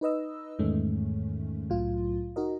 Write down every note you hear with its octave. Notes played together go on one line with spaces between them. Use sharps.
D#4 B4 D#5 E6
E2 G#2 D#3 G#3 A3 C#4
C2 A2 F#3 F4
D#4 F#4 A#4 D#5